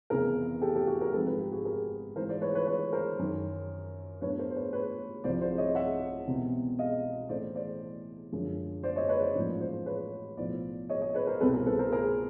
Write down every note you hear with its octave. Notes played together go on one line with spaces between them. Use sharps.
F1 E2 C#3 E3 G#4 A#4
G4 A4
G4 A4
F#4 G#4
G#4 A#4
G#1 G#2 F3 A4 B4
A4 B4
G4
F#4 G#4
G#4 A#4
G#2 E3 G#3 A#4 C5
C5 D5
B4 C#5
B4 C#5
B4 C#5
A#4 C5
F#2 D#3 F#3
A2 F#3 B3 D4 B4 C#5
A#4 C5
C5
B4 C#5
B4 C#5
C2 C3 F3 C5 D5
C5 D5
C#5 D#5
E5 F#5
E1 E2 C3
D#5 F5
A2 E3 A3 C#4 C5 D5
C5 D5
F#2 D3 F3 G#3
C5 D5
C#5 D#5
B4 C#5
C5 D5
A1 G#2 F3 A#3
C5 D5
B4 C#5
B1 A2 F3 C5 D5
C#5 D#5
C#5 D#5
B4 C#5
A#4 C5
C2 B2 G3 C4 A4 B4
G#4 A#4
A4 B4
A#4 C5
G#4 A#4